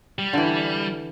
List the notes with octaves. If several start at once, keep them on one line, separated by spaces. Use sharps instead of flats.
G3
D3 E3